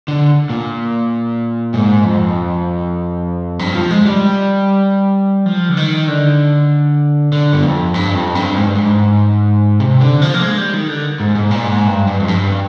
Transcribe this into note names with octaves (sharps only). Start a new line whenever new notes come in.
D3
A#2
G#2
F2
G2
F3
G#3
G3
F3
D3
D#3
D3
D3
G2
F2
G2
F2
G2
G#2
G2
G#2
C3
D3
F3
A#3
G#3
G3
D#3
D3
G#2
G#2
A#2
G#2
G2
G2
F2
G2